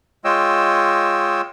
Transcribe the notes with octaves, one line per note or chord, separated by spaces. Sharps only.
G#3 F4 C#5 D#5 G5 E6